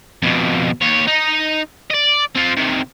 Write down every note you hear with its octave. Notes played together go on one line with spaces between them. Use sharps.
F2 B2
D#2 C#5
D#4
D5 D#5
C4 F4
C3 D#3